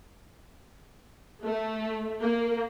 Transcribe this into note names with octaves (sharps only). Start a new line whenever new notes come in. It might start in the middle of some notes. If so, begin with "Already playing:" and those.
A3
A#3